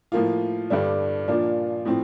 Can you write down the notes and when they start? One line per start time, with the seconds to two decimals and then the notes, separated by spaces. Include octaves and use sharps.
0.12 A2 F3 A#3 F4
0.70 G2 D3 G3 D4
1.28 A#2 F3 A#3 D4 F4
1.85 A2 F3 C4